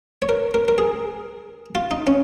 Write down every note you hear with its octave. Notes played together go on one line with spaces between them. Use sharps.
C#5
A#4
A#4
A#4
G#4
F4
D#4
C#4